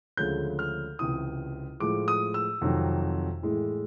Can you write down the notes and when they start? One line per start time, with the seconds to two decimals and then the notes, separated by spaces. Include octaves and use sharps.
0.17 D2 C#3 F3 G#3 G6
0.59 F6
0.99 C#2 C3 E3 D#6
1.80 A2 F3 G#3 D6
2.08 D#6
2.34 E6
2.61 F2 C3 D#3 F#3
3.43 A2 E3 G#3